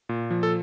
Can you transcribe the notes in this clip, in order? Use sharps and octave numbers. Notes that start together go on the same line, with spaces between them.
A#2
F3
A4